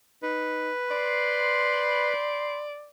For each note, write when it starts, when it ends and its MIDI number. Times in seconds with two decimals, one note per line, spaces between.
0.22 0.71 63
0.22 2.13 71
0.91 2.61 72
0.91 2.90 74
0.91 2.61 83
0.91 2.61 84